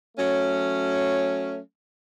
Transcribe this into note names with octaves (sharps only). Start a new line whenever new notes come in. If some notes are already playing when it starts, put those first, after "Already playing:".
F#3 A3 C#4